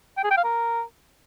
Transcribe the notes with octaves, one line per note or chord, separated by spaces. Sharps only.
G5
G#4
G5
F5
A#4